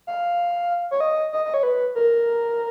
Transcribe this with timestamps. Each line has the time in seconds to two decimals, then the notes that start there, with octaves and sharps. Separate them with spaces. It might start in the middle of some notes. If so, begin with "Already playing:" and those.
0.07 F5
0.91 C#5
1.00 D#5
1.33 D#5
1.45 D#5
1.54 C#5
1.63 B4
1.95 A#4